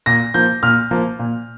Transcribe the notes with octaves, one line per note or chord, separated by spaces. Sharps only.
A#2 A#6
F3 A#3 G6
A#2 F6
F3 A#3
A#2